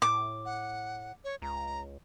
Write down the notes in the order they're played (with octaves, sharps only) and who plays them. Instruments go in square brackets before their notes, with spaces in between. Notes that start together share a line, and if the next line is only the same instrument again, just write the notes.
[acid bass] A2 [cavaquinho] D6
[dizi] F#5
C#5
[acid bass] C#2 [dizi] A#5